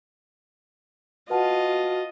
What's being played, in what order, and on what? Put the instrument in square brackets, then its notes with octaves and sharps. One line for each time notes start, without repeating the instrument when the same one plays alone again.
[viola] F4 D#5 [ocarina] F#4 [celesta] B4 F#5 A5